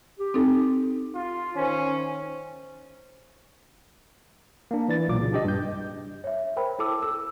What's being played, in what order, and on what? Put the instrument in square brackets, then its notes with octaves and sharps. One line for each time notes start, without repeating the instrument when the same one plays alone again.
[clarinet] G4
[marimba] C4 D#4 A4
[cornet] F4
[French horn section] D#3 C5 [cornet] C#4
[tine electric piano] A#3 D4
E3 D5 A6
B1 A#2 D6
C#3
D4 G4 D#5
G2 G6
[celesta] C#5 E5
A#4 C5 G5 B5
E4 A4 A5 D6 E6
A4 E6